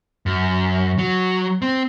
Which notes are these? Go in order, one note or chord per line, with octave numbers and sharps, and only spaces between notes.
F#2
F#3
C4